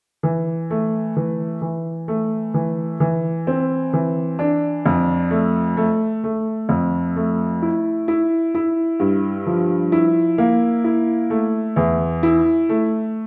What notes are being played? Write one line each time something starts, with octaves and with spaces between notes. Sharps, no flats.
E3
A3
E3
E3
A3
E3
E3
C4
E3
D4
F2
A3
A3
A3
F2
A3
E4
E4
E4
G2
F3
E4
A#3
E4
A3
E2
E4
A3